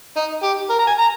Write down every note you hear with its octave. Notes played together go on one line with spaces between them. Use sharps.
D#4
G4
A#4
A#5
G#5
A#5